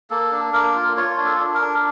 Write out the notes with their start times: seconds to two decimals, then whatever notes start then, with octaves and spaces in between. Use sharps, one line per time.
0.10 A#3 A4
0.32 D4
0.53 A#3 A#4
0.76 F4
0.97 F4 C#5
1.18 D4
1.25 A4
1.40 D4
1.54 A#4
1.61 D4